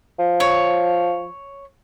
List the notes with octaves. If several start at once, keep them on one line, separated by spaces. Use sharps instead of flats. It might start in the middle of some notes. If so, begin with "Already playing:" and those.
F3
C#5